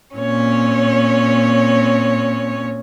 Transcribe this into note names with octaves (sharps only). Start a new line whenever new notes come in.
A#2 C4 C#4 C#5